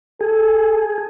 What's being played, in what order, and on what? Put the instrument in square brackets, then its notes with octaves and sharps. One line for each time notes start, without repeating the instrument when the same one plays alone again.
[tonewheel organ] G#4 [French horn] A4